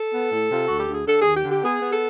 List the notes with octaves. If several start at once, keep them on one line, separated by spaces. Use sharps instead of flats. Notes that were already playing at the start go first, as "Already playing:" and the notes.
Already playing: A4
B3
A2
C3 F4
D2 F#4
G4
D2
G#4
D3 A4
D#2 G#4
G4
D3
G4
B3 G#4
B3
A4